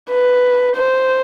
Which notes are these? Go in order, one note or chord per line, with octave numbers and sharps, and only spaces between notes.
B4
C5